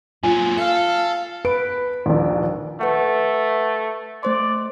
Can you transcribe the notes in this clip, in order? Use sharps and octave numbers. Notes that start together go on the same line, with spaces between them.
A#2 F#3 F4 G#5
A4 F5
B4 D7
A#1 D#2
A3 B4 F#5
A3 C5 D5 C6